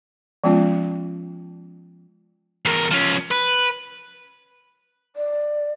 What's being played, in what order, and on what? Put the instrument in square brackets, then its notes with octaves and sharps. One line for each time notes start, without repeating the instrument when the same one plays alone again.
[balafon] F3 G#3 B3 C#4 F4
[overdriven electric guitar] E2 A#4
F3 C#4
B4
[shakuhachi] D5